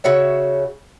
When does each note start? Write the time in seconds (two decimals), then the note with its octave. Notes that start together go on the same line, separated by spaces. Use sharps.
0.04 C#3 F#4 C#5 E5